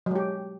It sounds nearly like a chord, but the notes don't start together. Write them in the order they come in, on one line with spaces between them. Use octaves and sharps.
F#3 G#3 G4